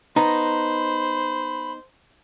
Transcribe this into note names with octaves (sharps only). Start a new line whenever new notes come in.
B3 D#4 C5 A#5 B5